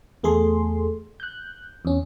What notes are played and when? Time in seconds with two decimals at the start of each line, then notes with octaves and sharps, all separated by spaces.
0.23 E2 A3 G#4 A4 C6
1.20 F#6 G6
1.85 E2 C#4